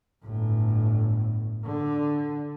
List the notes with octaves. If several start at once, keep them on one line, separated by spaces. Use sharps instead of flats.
G1 A2
D3